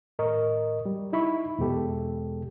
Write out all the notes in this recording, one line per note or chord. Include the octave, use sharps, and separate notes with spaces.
A2 A#4 D#5 C#6
G3
D#4 E4 B5 C#6
E2 B2 G#3 G4 A4